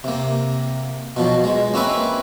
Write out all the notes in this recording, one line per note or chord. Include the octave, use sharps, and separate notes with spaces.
C3 A#3
B2 F3 F#3
G#3
A#3 C4 C#4 B4 E5 G#5